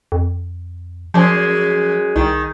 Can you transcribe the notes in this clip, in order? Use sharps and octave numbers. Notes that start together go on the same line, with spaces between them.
F2
F#2 F3 G#3
C2 D#3